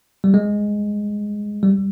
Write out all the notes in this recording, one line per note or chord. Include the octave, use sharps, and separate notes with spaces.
G3
G#3
G3